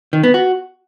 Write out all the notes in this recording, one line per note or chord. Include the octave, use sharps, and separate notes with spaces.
D#3
B3
F#4